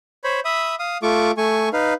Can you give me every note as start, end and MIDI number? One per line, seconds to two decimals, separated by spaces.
0.24 0.40 72
0.24 0.40 73
0.24 0.40 83
0.45 0.75 76
0.45 0.75 83
0.45 0.75 87
0.79 0.98 77
0.79 0.98 87
1.03 1.31 57
1.03 1.31 65
1.03 1.31 85
1.03 1.31 86
1.37 1.69 57
1.37 1.69 80
1.37 1.69 85
1.73 1.94 63
1.73 1.94 71
1.73 1.94 77